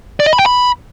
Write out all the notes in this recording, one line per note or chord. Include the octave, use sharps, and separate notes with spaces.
D5
D#5
B5
G5
B5